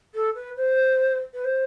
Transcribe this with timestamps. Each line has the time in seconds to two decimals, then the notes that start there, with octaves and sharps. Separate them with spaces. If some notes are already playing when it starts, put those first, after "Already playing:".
0.15 A4
0.35 B4
0.57 C5
1.34 B4
1.44 C5